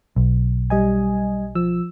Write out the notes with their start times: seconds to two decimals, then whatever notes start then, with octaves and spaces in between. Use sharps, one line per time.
0.16 B1
0.70 G3 D#5 G#5
1.55 F3 E6